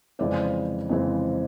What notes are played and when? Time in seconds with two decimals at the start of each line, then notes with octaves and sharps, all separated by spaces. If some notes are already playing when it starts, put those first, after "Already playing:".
0.19 F2 C#3 E3 G#3 C4 D5
0.89 F2 C#3 E3 G#3 C4